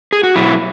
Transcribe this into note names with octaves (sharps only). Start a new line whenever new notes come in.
G#4
F#4
B2 F#3 E4